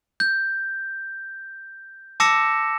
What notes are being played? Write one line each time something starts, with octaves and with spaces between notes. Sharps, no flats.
G6
A5 D6 E6 A#6 C#7 E7